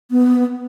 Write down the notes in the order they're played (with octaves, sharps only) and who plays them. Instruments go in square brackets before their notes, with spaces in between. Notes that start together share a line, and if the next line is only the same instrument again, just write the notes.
[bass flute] B3